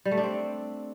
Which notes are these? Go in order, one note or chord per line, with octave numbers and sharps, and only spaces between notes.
G3
A3
D4
C4